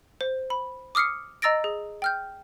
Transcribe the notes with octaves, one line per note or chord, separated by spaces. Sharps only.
C5
B5
D6 D#6 F6 C7 C#7
D#5 A#5 E6 A6 A#6 D7
G#4
G5 F6 G6